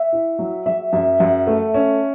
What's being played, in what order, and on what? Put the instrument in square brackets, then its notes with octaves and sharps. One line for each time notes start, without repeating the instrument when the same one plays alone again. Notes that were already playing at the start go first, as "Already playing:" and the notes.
Already playing: [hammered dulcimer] E5 F#5
[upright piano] E4
F#3
[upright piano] F#3 [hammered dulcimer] E5
[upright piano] F#2 [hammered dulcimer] E5
[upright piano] F#2 [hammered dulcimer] F#5
[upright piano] A3 [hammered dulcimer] E5
[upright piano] C#4